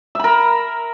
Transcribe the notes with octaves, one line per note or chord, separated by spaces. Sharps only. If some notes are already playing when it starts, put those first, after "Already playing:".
A#4 E5 B5